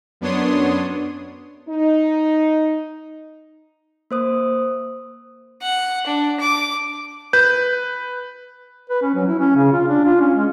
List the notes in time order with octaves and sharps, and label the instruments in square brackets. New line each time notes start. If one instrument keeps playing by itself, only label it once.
[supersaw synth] F#2 B3 D4 C#5 C6 D#6
[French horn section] D#4
[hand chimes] A#3 C5 D#6
[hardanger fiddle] F#5
D4
D6
[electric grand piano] B4 [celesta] G6
[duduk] B4
C#4
F#3
E4
C#4
C#3
F4
D4
F4
C#4
G#3